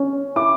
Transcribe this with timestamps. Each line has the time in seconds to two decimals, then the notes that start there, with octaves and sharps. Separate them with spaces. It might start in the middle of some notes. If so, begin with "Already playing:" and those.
Already playing: C#4
0.36 E4 D6